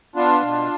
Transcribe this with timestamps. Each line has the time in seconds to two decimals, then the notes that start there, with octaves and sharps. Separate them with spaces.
0.16 B3 D4 F4
0.42 B2